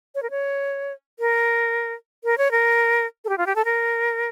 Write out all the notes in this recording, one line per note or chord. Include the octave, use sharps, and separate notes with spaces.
C#5
A#4
C#5
A#4
A#4
C#5
A#4
A4
G4
F4
G4
A4
A#4